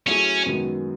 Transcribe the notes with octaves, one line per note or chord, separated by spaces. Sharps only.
F#3 A3 C#4 E4 G#4
F#2 D#3 G#3 B3 F#4